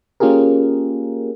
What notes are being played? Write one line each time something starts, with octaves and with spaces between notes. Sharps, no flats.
A#3 C#4 F4 G4 G#4 A#4